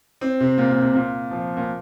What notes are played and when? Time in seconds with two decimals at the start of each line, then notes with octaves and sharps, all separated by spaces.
0.21 C4
0.40 C3
0.58 A#2
0.71 A#2
0.82 C3
0.95 A#2
1.31 F3
1.57 A#2